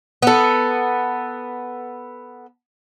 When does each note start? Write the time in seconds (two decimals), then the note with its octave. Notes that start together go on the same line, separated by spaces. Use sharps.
0.22 B3 A4